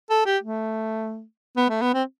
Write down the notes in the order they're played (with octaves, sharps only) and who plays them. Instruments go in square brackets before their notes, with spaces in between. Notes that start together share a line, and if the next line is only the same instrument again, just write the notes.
[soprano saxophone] A4
G4
A3
B3
A3
B3
C4